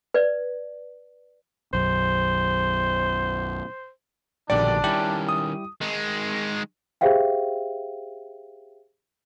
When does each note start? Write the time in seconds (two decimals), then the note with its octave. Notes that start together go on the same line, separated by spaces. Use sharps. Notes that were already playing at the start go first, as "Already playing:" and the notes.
0.14 B4 D5
1.73 B1 F#2 C5
4.50 A#1 G2 B2 D3 D#3 D4 G4 D5
4.84 D#3 G3 C#4 E4 G4
5.29 D#6
5.81 D#3 G#3
7.01 G4 G#4 C5 E5 F5 G5